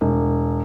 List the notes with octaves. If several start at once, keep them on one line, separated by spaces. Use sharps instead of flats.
E1